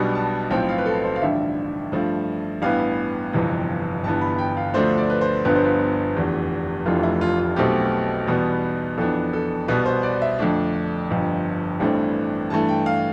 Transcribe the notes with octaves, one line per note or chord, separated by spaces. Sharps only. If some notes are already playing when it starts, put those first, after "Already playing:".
Already playing: B1 B2 G3 B3 D4 B5
A5
B1 A2 F3 C4 G5
F5
B4
A4
C5
F5
A1 G2 D3 F3 E5
G2 F3 A3
A1 G2 E3 B3 F5
G1 F2 C3 E3
G1 G2 E3 B3 A5
B5
G5
F5
D2 D3 F3 A3 D4 C5
D5
B4
C5
G1 G2 D3 F3 B3 B4
C5
B4
F1 E2 D3
F1 F2 E3 A3 D4 F4
E4
F4
F4
B1 B2 A3 C4 G4
E2 B2 G3 B3
F2 E3 B3 D4 A4
A4
C2 B2 B3 B4
C5
D5
E5
F2 D3 A3 D4
G1 F2 D3
A1 G2 E3 A3 C4
G2 E3 A3 A5
G5
F5